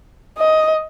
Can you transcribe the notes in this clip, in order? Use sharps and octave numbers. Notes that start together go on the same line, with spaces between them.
D#5